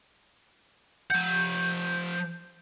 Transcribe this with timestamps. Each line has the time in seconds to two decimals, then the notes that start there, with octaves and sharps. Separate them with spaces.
1.10 F3 F#5 G6